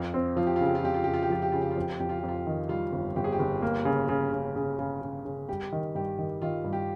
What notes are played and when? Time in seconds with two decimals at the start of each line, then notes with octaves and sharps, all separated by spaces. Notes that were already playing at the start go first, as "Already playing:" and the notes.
Already playing: F2 F4
0.14 C4
0.36 F3 F4
0.46 G4
0.56 C#3 F4
0.66 G4
0.75 F4
0.83 F2 G4
0.94 F4
1.04 C#3 G4
1.14 F4
1.23 G4
1.30 F3 F4
1.42 G4
1.52 C#3 F4
1.62 G4
1.71 F4
1.76 F2 G4
1.90 F4
2.00 F2 G4
2.09 F4
2.19 F2 G4
2.28 F4
2.47 D#3
2.69 G3 F4
2.92 G1
3.16 G1 G4
3.24 G#4
3.32 G4
3.39 G1
3.62 A#3
3.85 C#3
4.09 C#3
4.32 C#3
4.56 C#3
4.79 C#3
5.02 C#3
5.25 C#3
5.49 G3 G4
5.72 D#3
5.95 G2 G4
6.19 D#3
6.42 D#3 F4
6.65 G2
6.73 G4